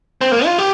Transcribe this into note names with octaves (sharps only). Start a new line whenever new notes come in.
C4
A#3
F4
G4